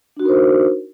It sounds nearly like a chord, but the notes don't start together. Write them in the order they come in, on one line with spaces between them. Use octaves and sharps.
D4 F#4 D#4 A#4 C5